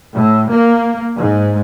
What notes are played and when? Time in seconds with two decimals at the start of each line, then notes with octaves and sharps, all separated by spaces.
0.14 A2
0.51 A#3
1.17 G#2